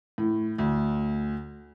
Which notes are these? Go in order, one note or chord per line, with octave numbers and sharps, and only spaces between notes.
A2
D2